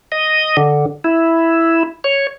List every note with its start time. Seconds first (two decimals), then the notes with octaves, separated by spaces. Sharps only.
0.12 D#5
0.57 D3
1.04 E4
2.04 C#5